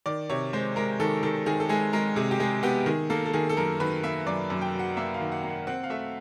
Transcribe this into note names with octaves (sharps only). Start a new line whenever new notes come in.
D#3 D5
C3 C#5
G#3 C5
G#3 A#4
D#3 A4
D#3 A4
D#3 G#4
A4
G#3 G#4
G#3 A#4
C3 G#4
G4
G#3 G#4
B3 G4
D#3 G#4
A#3 A4
A4
D#3 G#4
A4
F#2 A#4
D#3 B4
A#3 E5
F#2 D5
F#2
G5
F#3
F#5
A#3 E5
F5
D#3
F#5
A#3
F#5
C4 F#5
F5
A3 E5